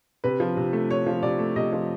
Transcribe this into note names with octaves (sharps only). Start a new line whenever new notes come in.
C3 B4
F3
C3
A3
C3 C#5
F3
C3 D5
A3
C3 D#5
F3